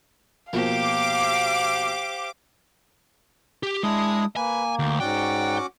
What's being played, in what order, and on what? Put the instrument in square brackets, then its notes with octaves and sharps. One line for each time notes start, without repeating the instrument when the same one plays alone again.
[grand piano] B2 F3 A#3 [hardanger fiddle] G4 C5 [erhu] F5 [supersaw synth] D6
[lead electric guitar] G4
[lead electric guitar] G#3 [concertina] D4 E4 D#6
[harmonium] A#3 [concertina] B4 [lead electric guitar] G#5
[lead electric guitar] D2 [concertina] G5
[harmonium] G#2 D5 F#5 [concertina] C#4 F#4 D6 [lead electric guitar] G5